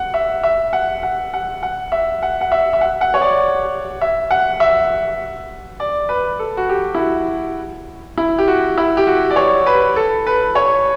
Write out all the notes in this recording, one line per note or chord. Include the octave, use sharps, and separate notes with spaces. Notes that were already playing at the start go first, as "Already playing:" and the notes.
Already playing: F#5
E5
E5
F#5
F#5
F#5
F#5
E5
F#5
F#5
E5
E5
F#5
F#5
C#5
D5
E5
F#5
E5
D5
B4
A4
F#4
G4
E4
F#4
E4
G4
F#4
E4
G4
F#4
D5
C#5
B4
A4
B4
C#5